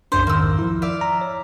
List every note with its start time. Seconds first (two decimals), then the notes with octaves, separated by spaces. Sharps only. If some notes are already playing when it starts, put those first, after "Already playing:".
0.12 B1 F#2 D4 C5
0.27 F2 G#2 D#3 A#3 E6
0.59 F3 E4
0.82 D5 E5 F5
1.01 A#5
1.21 C#5